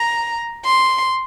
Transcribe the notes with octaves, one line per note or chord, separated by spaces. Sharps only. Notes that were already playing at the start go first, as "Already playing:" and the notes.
Already playing: A#5
C6